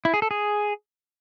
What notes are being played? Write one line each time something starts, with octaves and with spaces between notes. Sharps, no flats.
E4
G#4
A4
G#4